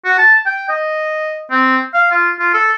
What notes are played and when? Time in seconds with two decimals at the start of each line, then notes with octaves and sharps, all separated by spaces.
0.05 F#4
0.18 A5
0.46 G5
0.69 D#5
1.51 C4
1.94 F5
2.11 F4
2.39 F4
2.54 A4